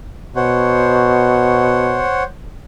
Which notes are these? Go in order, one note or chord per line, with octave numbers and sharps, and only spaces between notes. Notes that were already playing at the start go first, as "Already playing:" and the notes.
B2 C5 C#5 F#5